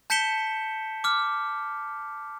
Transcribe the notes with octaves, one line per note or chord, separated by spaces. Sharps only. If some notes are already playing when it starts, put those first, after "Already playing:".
A5 G6 B6 C#7 E7 G7
D6 F6